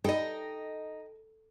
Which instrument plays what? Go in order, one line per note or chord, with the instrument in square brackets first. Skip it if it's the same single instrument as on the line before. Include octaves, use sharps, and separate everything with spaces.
[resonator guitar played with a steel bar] D#4 [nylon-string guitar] A4 [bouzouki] D#5 G5